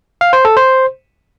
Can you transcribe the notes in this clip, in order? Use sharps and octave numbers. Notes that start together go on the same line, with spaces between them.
F5
C5
A4
C5